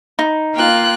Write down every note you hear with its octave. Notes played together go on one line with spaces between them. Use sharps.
D#4
A#3 F4 G5 F#6